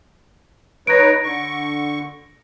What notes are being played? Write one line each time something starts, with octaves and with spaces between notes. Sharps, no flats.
D#4 B4 C#5 A#6 D7
D3 C#6